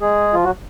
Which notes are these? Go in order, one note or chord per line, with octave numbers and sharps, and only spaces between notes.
G#3 G#4
F3 F4
F#3 F#4